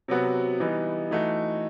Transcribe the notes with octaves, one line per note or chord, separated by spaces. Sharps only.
C3 F#3 B3 F#4
E3 G3 B3 D#4
E3 A3 D#4 F#4